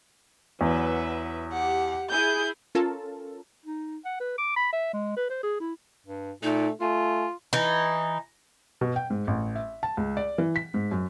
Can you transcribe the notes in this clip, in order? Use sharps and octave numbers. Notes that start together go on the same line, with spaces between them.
E2 F#3 B4 E5
G4 F#5
E4 G#4 G#5 G6
C#4 F4 A4 A#4 A5
D#4
F#5
B4
D6
B5
E5
G#3
B4
C5
G#4
E4
G2
A#2 A3 D#4
A3 F4 G#5
E3 D#4
B2
G5
G#2
A1
E5
A5
C#2
D5
E3
B6
G#2
F#2